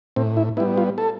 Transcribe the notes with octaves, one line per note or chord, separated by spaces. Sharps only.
A2 C4
E4
G3 B3 E4
F4
A4